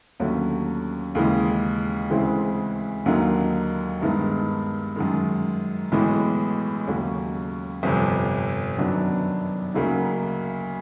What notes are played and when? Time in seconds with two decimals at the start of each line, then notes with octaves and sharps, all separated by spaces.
0.20 D#2 D3 F#3 A3 C#4
1.15 D#2 C#3 E3 G#3
2.10 D2 C#3 E3 G#3 C4
3.06 D#2 D3 F#3 A#3 D#4
4.01 G2 D#3 G#3 B3 D#4
4.96 F#2 D#3 G#3
5.92 B1 A2 E3 G#3 B3
6.87 D#2 C#3 F#3 A3 C#4
7.83 G1 F2 C3
8.78 F#2 D#3 F#3 B3 D4
9.74 D2 C#3 F#3 A#3 D#4